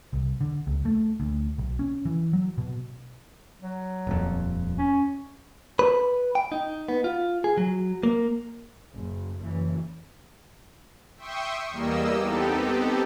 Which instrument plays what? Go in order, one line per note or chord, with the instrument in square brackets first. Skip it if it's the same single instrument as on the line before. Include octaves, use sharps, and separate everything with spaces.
[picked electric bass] C2
D3
C#2
A3
D2
B1
C#4
E3
F#3
B2
[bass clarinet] F#3
[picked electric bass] D#1 F2
[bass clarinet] C#4
[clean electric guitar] B4
G5
D#4
B3
F4
G#4
F#3
A#3
[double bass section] F#1
F#1 E3
[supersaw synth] E5 G5 C6 C#6 D#6
E2 G3 A#3 D#5 E6
B3 C4 D#4 G4 A4